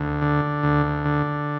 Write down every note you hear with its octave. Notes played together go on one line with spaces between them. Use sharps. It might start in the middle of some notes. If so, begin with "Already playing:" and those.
Already playing: D2
D3
D2
D3